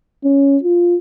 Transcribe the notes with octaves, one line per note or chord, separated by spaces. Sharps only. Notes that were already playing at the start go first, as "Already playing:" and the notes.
C#4
F4